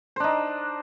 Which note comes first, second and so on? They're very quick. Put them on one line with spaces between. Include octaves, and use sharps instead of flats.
C5 D4 D#4